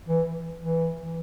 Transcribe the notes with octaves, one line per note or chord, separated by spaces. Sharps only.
E3
E3
E3